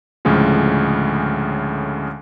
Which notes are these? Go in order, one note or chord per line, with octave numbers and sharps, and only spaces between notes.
D2 A2 C#3 F3 G#3 C#4